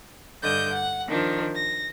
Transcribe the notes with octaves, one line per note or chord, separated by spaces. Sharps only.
G2 D3 D#5 G6
F#5
D#3 F3 D4
A#6